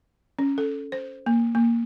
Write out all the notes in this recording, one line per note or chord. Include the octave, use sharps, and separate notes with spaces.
C#4
A4
C5
A#3
A#3